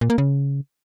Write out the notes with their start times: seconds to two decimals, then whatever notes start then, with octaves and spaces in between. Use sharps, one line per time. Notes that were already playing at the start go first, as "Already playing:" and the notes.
0.01 A#2
0.10 A#3
0.18 C#3